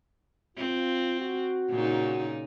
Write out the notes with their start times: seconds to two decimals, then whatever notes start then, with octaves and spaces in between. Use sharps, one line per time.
0.57 C4 F4
1.20 F#4
1.70 A#2 C#3 D#4